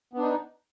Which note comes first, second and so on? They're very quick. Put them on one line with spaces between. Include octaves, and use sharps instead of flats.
B3 D4 D#4